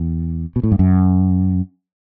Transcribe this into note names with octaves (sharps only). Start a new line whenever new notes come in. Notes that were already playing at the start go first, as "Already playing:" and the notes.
Already playing: E2
B2
A2
G2
F#2